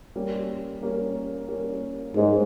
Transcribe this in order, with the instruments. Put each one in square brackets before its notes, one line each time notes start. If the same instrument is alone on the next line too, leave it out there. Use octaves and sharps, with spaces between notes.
[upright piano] G3 A#3 C#4
G3 A#3 C#4
G3 A#3 C#4
[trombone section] G#2 [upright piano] G3 A#3 C#4